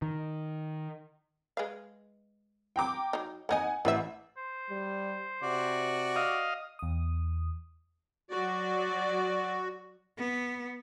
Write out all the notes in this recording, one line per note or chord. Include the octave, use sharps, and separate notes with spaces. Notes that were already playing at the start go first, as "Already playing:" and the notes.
D#3
G#3 B4 F5
G5 A#5 D6
F#3 D#4
A#3 D#4 D#5 F#5 G#5
A1 C4 B4 E5
C5
G3
C3 F#4 D5
D#5 F5
E2 D#6
F#3 F#4 D5
B3